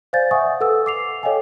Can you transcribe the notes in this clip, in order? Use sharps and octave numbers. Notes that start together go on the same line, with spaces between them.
C5 D5 F5 G#5 G6 A6
E5 F#5 G#5 C#6 D#6
A4 B4 F#5 E6
D6 C7 F7
A4 C#5 D#5 F5 G5 G#5